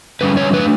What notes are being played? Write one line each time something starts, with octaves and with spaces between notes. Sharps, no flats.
D3 G3 C#4 B4
C#5
E3 A3 D4 B4